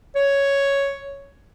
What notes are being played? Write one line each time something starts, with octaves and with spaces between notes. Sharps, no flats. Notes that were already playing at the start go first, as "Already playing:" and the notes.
C#5